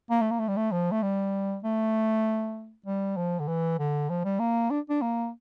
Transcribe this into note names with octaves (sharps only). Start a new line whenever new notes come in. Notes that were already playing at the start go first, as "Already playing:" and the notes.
A#3
A3
A#3
A3
G3
A3
F3
A3
G3
A3
G3
F3
D3
E3
D3
F3
G3
A#3
D4
D4
A#3